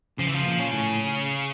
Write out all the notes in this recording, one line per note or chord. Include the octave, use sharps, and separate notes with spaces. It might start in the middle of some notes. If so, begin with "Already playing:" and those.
C#3 F3
E3
F3
A#2
C#3
A2